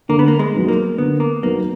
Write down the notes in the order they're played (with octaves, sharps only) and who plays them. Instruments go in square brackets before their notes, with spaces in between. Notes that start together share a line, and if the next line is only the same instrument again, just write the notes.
[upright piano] D3 [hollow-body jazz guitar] A#3
[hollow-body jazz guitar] B3
A#3
G#3
[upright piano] F#3 B3 D#4
[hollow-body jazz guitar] A#3
[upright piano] D3 [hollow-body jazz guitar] B3
[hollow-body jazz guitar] A#3
[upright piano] F#3 B3 D#4 [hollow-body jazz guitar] A#3